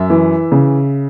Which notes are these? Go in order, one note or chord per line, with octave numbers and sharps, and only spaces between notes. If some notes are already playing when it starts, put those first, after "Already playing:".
Already playing: F#2 E5
E3
C#3